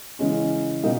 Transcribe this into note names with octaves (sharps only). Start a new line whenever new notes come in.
C#3 E3 G#3 C#4
B2 G3 A#3 D#4